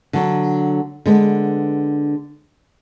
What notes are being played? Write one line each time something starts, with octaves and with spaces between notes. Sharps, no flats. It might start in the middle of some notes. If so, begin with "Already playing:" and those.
D3 F#3
D3 G#3 B3